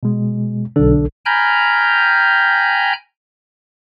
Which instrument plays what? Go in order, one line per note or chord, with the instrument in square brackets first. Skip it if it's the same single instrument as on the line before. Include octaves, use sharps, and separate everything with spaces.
[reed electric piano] B2 G#3
[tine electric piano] B1 A4 [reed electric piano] D3 D4
[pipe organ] G5 G#5 A#5 B5 F6 G6